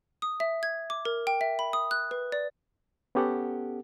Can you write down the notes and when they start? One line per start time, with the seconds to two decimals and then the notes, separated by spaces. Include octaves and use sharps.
0.22 D#6
0.40 E5
0.63 G#6
0.90 D6
1.05 A#4
1.27 G5
1.41 E5
1.59 B5
1.73 D#6
1.91 F#6
2.11 B4
2.32 D5
3.15 B3 C#4 G4 A4 F#5